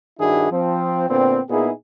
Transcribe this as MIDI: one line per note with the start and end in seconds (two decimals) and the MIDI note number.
0.19 0.49 43
0.19 0.49 51
0.19 0.49 62
0.19 0.49 64
0.19 0.49 66
0.19 0.49 68
0.51 1.09 53
0.51 1.09 60
1.10 1.39 46
1.10 1.39 50
1.10 1.39 59
1.10 1.39 60
1.50 1.71 46
1.50 1.71 59
1.50 1.71 63
1.50 1.71 64
1.50 1.71 68